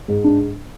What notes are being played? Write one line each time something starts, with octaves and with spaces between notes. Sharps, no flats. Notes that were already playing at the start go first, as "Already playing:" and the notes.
G#2
D4